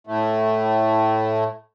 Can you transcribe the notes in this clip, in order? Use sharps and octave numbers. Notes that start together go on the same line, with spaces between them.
A2 A3